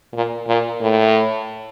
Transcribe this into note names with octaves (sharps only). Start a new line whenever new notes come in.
A#2
A#2
A2